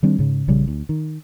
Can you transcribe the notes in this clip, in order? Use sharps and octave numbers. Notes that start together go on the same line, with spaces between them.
D#3 G3 C4 D4
G#2 C#3
A#1 C#3 G3
D2
D#3